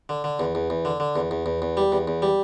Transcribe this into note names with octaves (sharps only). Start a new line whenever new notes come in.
D3
D3
E2
E2
E2
D3
D3
E2
E2
E2
E2
G3
E2
E2
G3